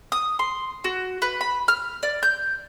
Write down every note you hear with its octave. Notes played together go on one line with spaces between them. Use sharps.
D#6
C6
F#4
B4
B5
F6
D5
G6